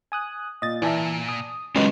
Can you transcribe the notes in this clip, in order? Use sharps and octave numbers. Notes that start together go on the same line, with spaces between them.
G#5 D#6 F#6
A#2 D#5 A6
A#2 E3 D5 E5 G#5 A5
D#6
D#3 F#3 G#3 C#4 G4 B4 D#5